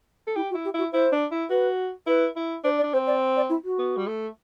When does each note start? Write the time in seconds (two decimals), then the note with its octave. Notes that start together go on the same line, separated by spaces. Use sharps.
0.27 A4
0.36 E4 G4
0.50 F#4
0.54 E4
0.65 G4
0.74 E4 F#4
0.92 E4 C5
1.12 D4
1.32 E4
1.50 F#4 B4
2.07 E4 B4
2.36 E4
2.64 D4 C5
2.78 D5
2.83 D4
2.93 C4 C5
3.07 D5
3.36 D5
3.49 E4
3.64 F#4
3.78 B3
3.97 G3
4.07 A3